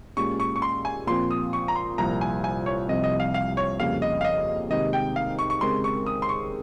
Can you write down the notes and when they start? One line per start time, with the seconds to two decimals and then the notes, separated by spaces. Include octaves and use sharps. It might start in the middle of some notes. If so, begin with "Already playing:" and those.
0.17 A#2 G#3 C#4 G4 C#6
0.40 C#6
0.56 C#6
0.62 C6
0.85 G#5
1.07 A#2 F3 C4 C6
1.31 D#6
1.53 C#6
1.68 A#5
1.75 C6
1.98 C2 A#2 F3 A#5
2.21 G#5
2.44 G#5
2.66 C#5
2.88 C2 C3 F3 D#5
3.04 D#5
3.20 F5
3.34 F5
3.57 C#5
3.80 F2 C#3 G3 A#3 F5
4.02 D#5
4.21 F5
4.25 D#5
4.70 C3 D#3 G#3 D#4 G4 D#5
4.93 G5
5.16 F5
5.39 C#6
5.50 C#6
5.61 C#3 G#3 C4 G4 A#4 C6
5.84 C#6
6.06 D#6
6.22 C6
6.29 C#6